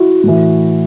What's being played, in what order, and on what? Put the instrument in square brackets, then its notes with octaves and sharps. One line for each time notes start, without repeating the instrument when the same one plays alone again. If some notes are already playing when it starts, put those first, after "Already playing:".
Already playing: [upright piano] E4 F#4
A2 E3